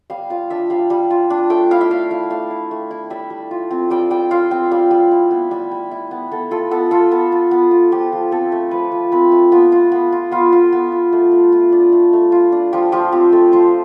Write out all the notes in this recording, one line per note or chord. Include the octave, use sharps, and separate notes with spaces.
G3 F5
F4 F5
D4 E5
G3 F5
G3
F4
D4
A3 G5
E4 F5
E5
A3 F5
E4 F5
A3 F5
E4
A3
E4
G3 E5
G3
F4
C4
G3 G5
G3 G5
F4 F5
C4 G5
G3 F5
G3
E4
B3
G3 E5
G3
E4
B3
B3 A4
F4 A4
B3 A4
F4 A4
B3 A4
F4
B3
F4
F3 G4
F3
C4 A4
A3
F3 B4
F3
C4 B4
A3
B3 F4
F4
B3
F4
B3 F4
F4
B3
F4
A3
A3
F4
D4
A3
A3
F4
D4
F3 G4
F3 G4
C4 G4
A3 A4
F3 C5